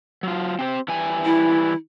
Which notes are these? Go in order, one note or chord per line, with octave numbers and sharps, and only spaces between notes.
F#3 F4
C4 G4 C5
E3 G3 G#5
E4